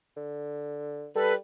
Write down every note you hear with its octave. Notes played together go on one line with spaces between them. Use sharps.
D3
G3 A4 B4